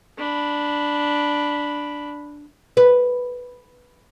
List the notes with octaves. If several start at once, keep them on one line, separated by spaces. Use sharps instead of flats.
D4 B5
B4